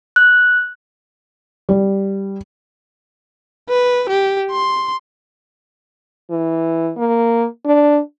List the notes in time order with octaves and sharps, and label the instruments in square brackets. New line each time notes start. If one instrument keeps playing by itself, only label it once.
[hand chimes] F#6
[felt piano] G3
[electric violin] B4
G4
C6
[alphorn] E3
A#3
D4